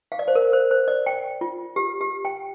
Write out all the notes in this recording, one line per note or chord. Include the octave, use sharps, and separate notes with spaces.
F5
D5
C5
A#4
C5
C5
D5
G5
F4
G4
G4
G5